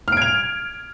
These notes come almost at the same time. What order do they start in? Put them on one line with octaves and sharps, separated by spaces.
F6 D7 G#6 F7